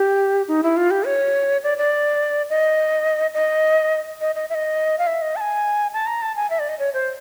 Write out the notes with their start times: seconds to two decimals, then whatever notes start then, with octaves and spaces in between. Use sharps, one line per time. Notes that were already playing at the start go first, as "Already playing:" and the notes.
Already playing: G4
0.48 D#4
0.63 E4
0.77 F4
0.91 G4
1.06 C#5
1.63 D5
1.78 D5
2.49 D#5
3.34 D#5
4.21 D#5
4.35 D#5
4.50 E5
4.55 D#5
4.99 F5
5.07 E5
5.22 D#5
5.36 A5
5.41 G#5
5.93 A5
6.07 A#5
6.22 A5
6.36 G#5
6.50 E5
6.59 D5
6.69 D#5
6.79 C#5
6.94 C5